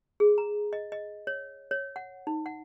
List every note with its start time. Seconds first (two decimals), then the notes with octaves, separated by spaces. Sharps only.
0.20 G#4
0.38 A#5
0.73 D#5
0.92 D#5
1.27 C#5
1.71 C#5
1.96 F#5
2.27 D#4
2.46 F#5